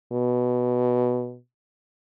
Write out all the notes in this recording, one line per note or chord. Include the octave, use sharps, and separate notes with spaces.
B2